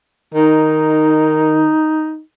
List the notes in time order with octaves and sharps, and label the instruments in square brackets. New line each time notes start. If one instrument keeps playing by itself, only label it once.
[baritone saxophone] D#3 [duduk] D#4